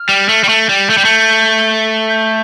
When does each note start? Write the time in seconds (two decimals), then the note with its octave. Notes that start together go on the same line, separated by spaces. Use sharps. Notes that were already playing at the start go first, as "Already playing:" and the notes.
Already playing: F6
0.09 G3
0.29 A3
0.44 G3
0.49 A3
0.69 G3
0.89 A3 G6
0.98 G3
1.05 A3
2.09 G6